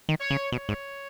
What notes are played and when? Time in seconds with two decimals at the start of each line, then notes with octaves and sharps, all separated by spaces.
0.09 D#3
0.20 C#5
0.30 C#3
0.52 B2 C#5
0.69 G#2